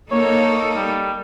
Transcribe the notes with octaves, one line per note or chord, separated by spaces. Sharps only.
A#3 D#4 A4 C#5
G3